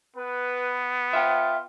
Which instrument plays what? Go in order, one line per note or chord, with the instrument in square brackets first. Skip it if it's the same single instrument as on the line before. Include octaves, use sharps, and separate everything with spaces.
[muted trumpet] B3 [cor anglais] B4
[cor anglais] F4 [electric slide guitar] E5 G5